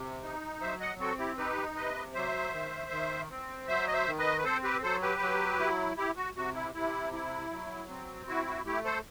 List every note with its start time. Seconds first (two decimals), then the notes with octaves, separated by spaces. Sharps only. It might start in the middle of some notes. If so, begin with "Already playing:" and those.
Already playing: C3
0.23 D#4
0.61 F#3 C5 E5
0.80 D#5 F#5
1.00 C4 F#4 A4
1.19 E4 G4
1.38 D#4 G4 B4
1.76 C3 B4 D#5
2.14 F#3 C5 E5
2.52 D#3
2.91 D#3
3.30 C4
3.68 F#3 C5 E5
3.87 D#5
3.93 C5 E5
4.06 D#3
4.19 B4 D#5
4.38 B4
4.44 C4 A4 C5
4.64 G4 B4
4.83 F#3 A4 C5
5.02 G4 B4
5.20 F#3
5.60 E4
5.97 E4 G4
6.16 F#4
6.36 C3 F#4
6.55 E4
6.75 C3 E4
7.13 E4
7.51 F#3
7.89 C4
8.28 E4 F#4
8.47 F#4
8.66 A3 E4 G4
8.85 A4 C5